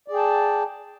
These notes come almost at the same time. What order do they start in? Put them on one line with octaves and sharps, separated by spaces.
D5 G#4 G5 A5